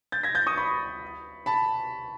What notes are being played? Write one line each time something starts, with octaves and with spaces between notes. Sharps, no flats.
G6 A6
G#6 A#6
G6 A6
C#6 D#6
B5 C#6
A5 B5